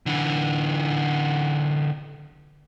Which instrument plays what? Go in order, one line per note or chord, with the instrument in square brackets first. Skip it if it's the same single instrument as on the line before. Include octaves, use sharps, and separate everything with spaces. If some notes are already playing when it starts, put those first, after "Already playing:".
[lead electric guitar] D3 E3